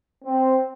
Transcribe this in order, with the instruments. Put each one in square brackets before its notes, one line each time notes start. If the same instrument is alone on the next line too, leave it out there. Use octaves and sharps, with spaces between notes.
[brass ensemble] C4